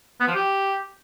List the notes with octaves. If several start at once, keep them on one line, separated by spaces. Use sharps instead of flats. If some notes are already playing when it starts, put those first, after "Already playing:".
B3
F3
G4